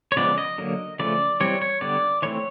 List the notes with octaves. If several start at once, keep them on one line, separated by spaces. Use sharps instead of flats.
C#5
C#3 F3 G#3 B3 D5
D#5
D3 F#3 A#3
C#3 F3 A3 D5
E3 G3 C4 C#5
C#5
D3 G3 B3 D5
E3 A3 C4 C#5